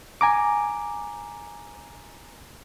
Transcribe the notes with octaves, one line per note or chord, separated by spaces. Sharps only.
G#5 A#5 D6